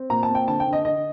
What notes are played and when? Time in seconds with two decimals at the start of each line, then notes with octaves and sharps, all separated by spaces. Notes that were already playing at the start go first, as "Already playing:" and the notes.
Already playing: C4
0.10 A#2 A#5
0.23 A5
0.29 C4
0.35 G5
0.48 D3 A5
0.60 G5
0.66 D3
0.73 D#5
0.85 D3 D#5